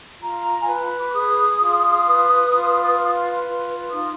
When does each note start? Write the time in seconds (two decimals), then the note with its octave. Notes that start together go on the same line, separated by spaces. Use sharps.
0.20 F4 A#5
0.60 G#5
0.67 B4
0.74 A#5
0.87 B5
1.00 D6
1.14 G#4 D#6
1.60 F4
2.06 B4
2.52 F4
2.98 B4
3.44 F4
3.90 D#4 D#6